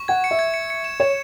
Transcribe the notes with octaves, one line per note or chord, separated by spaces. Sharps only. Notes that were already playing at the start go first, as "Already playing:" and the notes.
Already playing: C#6
F#5 G#6
C#7
E5
G#6
C#7
C#7
E7
C#5 E7